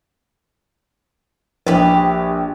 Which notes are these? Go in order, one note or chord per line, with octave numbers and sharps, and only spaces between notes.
A#1 G4 B4